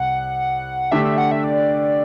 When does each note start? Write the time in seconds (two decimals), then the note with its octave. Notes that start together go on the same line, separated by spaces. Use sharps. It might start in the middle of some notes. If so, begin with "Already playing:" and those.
Already playing: C2 F#5
0.92 D3 A3 D4 G4 E5
1.05 E5
1.18 F#5
1.32 E5
1.44 D5